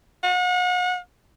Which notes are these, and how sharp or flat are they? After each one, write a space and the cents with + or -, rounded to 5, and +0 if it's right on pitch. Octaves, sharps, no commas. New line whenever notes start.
F#5 -40